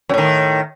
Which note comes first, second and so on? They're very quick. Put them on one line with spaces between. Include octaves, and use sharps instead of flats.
F#2 A2 D#3